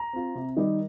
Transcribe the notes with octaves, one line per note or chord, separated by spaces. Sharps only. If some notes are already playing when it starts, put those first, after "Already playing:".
Already playing: A#5
C4 F4
C3
D#3 G3 D#4